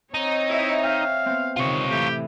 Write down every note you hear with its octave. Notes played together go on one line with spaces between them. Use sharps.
C4 D#4 C#5
E4 D#5 E5 E6
E5 F5 G5
B3 C4
C3 D#3 F4 C#5
A2 E3 G4